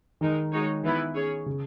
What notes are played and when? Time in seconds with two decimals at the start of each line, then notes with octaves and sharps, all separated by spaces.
0.21 D#3 G#3 D#4 A#4
0.52 G#3 D#4 F#4 C#5
0.84 D#3 E3 B3 E4 B4
1.15 C#4 G#4 C#5
1.46 C#3